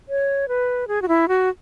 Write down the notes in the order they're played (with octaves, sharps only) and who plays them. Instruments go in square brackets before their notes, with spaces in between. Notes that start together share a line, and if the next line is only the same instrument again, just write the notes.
[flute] C#5
B4
G#4
F#4
E4
F#4